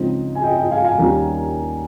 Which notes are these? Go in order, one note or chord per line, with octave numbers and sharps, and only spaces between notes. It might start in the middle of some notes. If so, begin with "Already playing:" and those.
Already playing: C#2 C#3 F3 C4 D#4 C5 D#5
G#5
D#5 G5
D#5 G5
F5 G#5
F5 G#5
D#2 D#3 G3 A#3 C#4